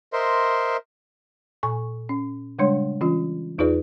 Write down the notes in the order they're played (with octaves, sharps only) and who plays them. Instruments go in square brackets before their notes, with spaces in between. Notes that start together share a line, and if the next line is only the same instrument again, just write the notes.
[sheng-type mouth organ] A#4 C5 D#5 E5 C6
[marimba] A#2 G#5 C#6
C#4
C#3 G3 G#3 D4 C#5 C6
E3 C#4 F4
E2 D#4 F4 G#4 B4 D5